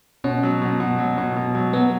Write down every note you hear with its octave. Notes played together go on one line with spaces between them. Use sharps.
B2 C#4
F#3
B2
B2
F#3
B2
B2
F#3
F#3 B3